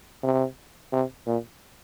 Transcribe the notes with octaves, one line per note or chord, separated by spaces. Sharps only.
C3
C3
A#2